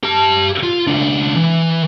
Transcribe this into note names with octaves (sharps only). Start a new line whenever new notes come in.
G4 A5
F4
C#2 D4
E3